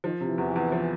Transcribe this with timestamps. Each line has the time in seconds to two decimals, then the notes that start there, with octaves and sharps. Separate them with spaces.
0.04 D#3 F3
0.20 C3
0.26 E3
0.38 E2
0.50 E3
0.56 E2
0.72 F3